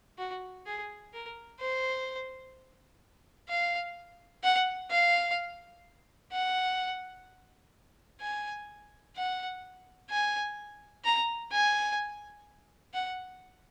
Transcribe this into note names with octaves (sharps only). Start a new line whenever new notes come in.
F#4
G#4
A#4
C5
F5
F#5
F5
F#5
G#5
F#5
G#5
A#5
G#5
F#5